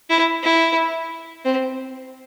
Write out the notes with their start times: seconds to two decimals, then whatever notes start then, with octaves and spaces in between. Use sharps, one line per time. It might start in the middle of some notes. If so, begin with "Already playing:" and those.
0.10 E4
0.43 E4
1.45 C4